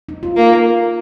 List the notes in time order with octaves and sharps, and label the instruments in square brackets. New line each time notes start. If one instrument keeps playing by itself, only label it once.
[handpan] D#4
F4
[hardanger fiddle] A#3